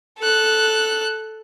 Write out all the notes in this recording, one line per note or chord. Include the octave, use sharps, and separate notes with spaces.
A4 F#6